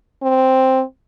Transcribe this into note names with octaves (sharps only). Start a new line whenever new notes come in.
C4